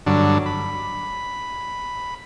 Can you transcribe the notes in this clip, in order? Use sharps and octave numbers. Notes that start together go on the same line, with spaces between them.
G2 D3 F#3 D4
B5